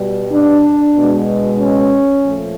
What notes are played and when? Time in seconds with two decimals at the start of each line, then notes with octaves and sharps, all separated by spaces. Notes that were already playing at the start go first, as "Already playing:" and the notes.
Already playing: B2 G3
0.32 D4
0.95 B2 G#3
1.59 C#4
2.23 A#2 F3 A3